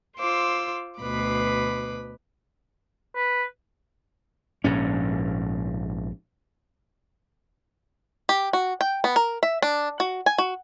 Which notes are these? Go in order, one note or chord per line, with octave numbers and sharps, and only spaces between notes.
F4 C5 D6 E6
D2 B2 B4 B5 D6
B4
A#1 G#2 C#4
G4
F#4
G5
B3
A#4
E5
D4
F#4
G#5
F#4